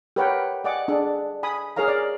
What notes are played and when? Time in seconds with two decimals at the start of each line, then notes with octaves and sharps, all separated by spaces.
0.16 G4 A#4 B4 C#5 F#5 G5
0.64 D5 D#5 F#5 G#5 D6
0.88 D4 G#4
1.43 G#5 B5 D#6
1.76 G#4 A#4 C#5 F5 A#5
1.88 D5